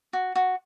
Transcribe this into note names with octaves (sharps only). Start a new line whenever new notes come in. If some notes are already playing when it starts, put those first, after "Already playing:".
F#4
F#4